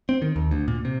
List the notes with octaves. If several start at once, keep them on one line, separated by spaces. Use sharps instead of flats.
C4
D#3
D#2
D2
A#2
C3